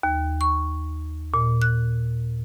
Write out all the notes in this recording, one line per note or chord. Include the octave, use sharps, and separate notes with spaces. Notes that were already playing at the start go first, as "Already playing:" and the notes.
D#2
C#6
A#2
F#6